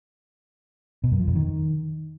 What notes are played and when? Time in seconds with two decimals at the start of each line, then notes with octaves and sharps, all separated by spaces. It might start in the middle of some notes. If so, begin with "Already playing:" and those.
1.04 B2
1.11 F#2
1.19 F3
1.27 F2
1.35 D#3